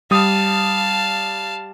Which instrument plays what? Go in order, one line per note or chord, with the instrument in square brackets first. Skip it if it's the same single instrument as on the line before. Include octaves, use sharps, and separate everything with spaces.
[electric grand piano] G3 D#6 [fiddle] F5 A5